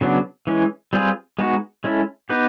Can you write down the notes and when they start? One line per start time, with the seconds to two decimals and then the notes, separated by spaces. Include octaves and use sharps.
0.01 C#3 F#3 B3 D4
0.47 E3 G#3 C#4
0.93 G3 C4 F4 G#4 B4
1.39 G#3 B3 D#4 F#4
1.84 G#3 C#4 E4 A4
2.29 B3 D#4 G4 B4